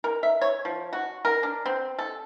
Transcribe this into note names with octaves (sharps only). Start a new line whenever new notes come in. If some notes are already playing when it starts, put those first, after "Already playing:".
A#4
E5
C#5
F3
F#4
A#4
D4
C4
A4